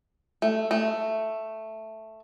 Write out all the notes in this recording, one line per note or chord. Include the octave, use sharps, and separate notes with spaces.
A3
A3